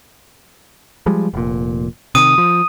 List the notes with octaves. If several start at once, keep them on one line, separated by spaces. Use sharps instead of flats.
F3 G3 G#3
F1 A#2
C3 D#3 D#6 D#7
F3